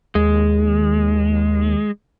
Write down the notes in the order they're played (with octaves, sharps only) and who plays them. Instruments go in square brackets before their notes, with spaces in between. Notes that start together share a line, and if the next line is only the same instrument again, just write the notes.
[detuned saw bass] D#2 [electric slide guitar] G#3